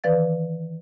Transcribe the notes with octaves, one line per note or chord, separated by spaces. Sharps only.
D#3 E3 B4 D5 F5 A6